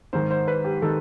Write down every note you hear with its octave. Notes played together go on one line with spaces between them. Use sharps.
G#2 D#3 C5
C5
B4
G4
D#3 A4